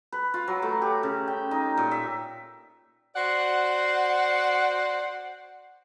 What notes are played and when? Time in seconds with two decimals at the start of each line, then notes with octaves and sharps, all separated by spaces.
0.12 B4
0.34 F4
0.48 F#3
0.62 A3
0.82 G4
1.03 C#3
1.28 G5
1.51 D#4
1.77 A#2
1.91 E5
3.15 F#4 C5 D5 F#5